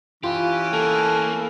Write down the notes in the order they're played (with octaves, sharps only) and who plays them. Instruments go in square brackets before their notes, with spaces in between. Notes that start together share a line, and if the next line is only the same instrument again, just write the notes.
[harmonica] E3 C#4 [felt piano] F4 [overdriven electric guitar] G4
[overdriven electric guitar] A#3 [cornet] A4